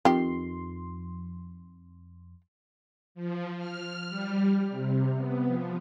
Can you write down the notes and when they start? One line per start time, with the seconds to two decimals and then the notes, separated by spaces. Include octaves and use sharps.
0.05 F2 D#3 G4 C6
3.15 F3
3.58 F6
4.10 G3
4.70 C3
5.15 B3
5.46 F3